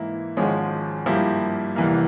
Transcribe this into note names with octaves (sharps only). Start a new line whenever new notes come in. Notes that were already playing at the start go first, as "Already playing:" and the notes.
Already playing: G#2 E3 A#3 E4
G#1 G#2 F3 G#3 C#4
G2 F3 A#3 E4 G4
F1 E2 E3 G3 A#3